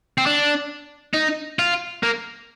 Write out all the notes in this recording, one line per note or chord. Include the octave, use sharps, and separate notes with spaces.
C4
D4
D#4
F4
A#3